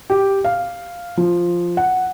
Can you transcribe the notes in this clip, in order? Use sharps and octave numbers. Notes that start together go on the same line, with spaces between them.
G4
F5
F3
F#5